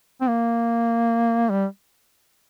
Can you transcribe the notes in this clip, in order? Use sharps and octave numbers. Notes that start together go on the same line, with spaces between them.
C4
A#3
G3